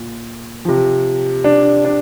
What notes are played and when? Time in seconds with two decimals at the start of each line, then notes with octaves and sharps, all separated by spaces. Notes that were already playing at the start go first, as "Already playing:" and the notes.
Already playing: A#2
0.65 C3 F3
1.44 D4
1.85 D4